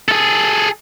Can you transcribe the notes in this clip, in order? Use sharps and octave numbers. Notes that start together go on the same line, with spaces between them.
G#4 A4